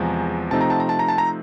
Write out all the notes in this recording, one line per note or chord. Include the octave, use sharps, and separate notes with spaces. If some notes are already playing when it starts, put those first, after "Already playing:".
Already playing: E2 C3 F3 G#3 G#5 A#5
C3 F3 A3 C4 D#4 A5
A#5
A5
A#5
A5
A#5
A5
A#5